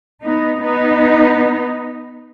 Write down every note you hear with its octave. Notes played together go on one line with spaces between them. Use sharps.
B3 D#4
B3 D#4